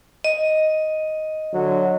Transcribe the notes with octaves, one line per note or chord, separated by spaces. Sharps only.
D#5
D3 F#3 F#4